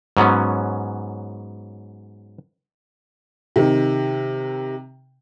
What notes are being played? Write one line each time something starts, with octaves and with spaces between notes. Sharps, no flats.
G#2 F#3 B3 C#4
C3 D#3